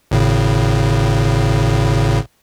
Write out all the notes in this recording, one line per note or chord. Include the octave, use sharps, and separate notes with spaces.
G#1 A2 C#3